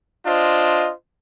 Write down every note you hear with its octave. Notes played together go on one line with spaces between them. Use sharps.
D4 F4 C5 D#5